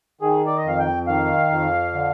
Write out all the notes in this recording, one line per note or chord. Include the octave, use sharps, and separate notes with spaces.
D#3 G#4
D5
D#5
F2 F5
G5
D#3 F5
F2
D3